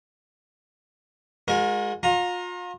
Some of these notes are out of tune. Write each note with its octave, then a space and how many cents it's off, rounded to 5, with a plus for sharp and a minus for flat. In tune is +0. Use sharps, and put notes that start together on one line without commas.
G#3 +0 F#4 -40 A#4 +25
F4 +40 A#5 +0